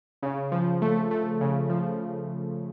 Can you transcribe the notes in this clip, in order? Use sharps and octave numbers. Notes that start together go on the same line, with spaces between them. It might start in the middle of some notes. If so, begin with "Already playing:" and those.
C#3
F3
A3
A3
C#3
F3